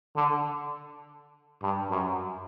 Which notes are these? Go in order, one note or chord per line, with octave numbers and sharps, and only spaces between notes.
D3
G2
F#2